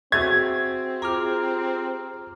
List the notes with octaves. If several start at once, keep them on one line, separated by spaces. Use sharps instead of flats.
C4 F#4 G#4 E5 G#6
F4 G4 G#4 A#5 D6 F6